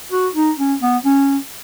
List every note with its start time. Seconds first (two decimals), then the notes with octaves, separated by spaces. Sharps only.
0.12 F#4
0.35 D#4
0.58 C#4
0.82 B3
1.05 C#4